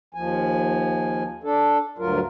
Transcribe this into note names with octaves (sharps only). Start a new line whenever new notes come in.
D#2 F3 G#5
D4 A4
D2 G2 F#3 F4 A#4